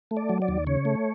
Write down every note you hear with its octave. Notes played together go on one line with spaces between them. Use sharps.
A3
D5
F#3
D5
D#2
C#3 C#5
A3